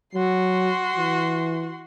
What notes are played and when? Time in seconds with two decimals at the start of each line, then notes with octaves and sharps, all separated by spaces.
0.14 F#3 F#4 C6
0.97 E3